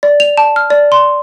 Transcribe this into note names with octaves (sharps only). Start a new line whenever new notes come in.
D5
F7
A5
F6
D5
C6